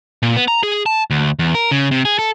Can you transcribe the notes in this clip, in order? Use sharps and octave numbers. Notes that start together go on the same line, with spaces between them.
A#2
B3
A#5
G#4
A5
D2
E2
A#4
C#3
C3
G#4
A4